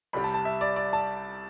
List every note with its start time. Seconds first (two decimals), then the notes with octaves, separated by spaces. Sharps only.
0.13 C2 C3 G3 B5
0.24 A5
0.34 A5
0.45 E5
0.61 D5
0.76 D5
0.93 A5